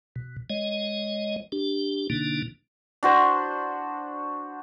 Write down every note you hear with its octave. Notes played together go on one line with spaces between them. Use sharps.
B2
G#3 C#5 D#5
D4 G4
B2 D3 A#3 D4 D#4
D4 F#4 C5